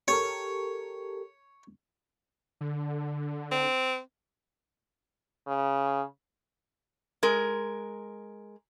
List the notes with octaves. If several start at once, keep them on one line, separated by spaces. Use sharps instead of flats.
G4 A4 A#4 C#5
D3
C4
C#3
G#3 A#4